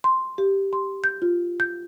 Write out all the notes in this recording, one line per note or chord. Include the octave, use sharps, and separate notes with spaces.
C6
G4
C6
G6
F4
G6